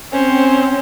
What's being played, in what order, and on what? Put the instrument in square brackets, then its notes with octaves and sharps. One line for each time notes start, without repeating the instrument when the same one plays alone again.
[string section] C4 [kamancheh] C#4 C5